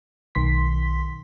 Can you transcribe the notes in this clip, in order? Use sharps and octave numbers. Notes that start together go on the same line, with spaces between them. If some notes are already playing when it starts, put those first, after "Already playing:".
B1 D#3 C6 B6